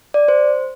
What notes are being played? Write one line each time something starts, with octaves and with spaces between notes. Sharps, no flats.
D5
C5